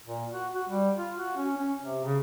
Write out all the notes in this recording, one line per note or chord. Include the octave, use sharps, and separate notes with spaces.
A#2
F#4
F#4
G3
F4
F#4
C#4
C#4
C3
C#3